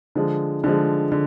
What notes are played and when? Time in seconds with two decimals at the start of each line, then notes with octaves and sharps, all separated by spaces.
0.15 D3 F3 G#3
0.64 D3 F3 G#3
1.12 D3